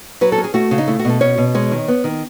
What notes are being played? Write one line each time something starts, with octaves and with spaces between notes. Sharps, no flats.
F#3 B4
A4
C#4
G#4
A3 F#4
C#3
D#4
A3 E4
F#4
B2 A4
C#4 C#5
B2
G#3 C#5
D#3
B3
D#3